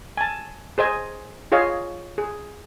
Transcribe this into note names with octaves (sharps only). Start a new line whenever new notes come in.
G#5 A5
G#4 C5 D#5 G#5
F4 G#4 C#5 D#5 F5
G#4